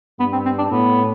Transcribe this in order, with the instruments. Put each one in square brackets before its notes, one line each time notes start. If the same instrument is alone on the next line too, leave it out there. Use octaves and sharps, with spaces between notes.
[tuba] G2 [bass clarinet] B3
[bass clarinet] C4
C4
D4
[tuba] A2 [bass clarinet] B3